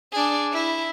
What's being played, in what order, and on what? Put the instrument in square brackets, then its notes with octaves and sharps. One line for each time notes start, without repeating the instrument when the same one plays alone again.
[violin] D4 G#4
E4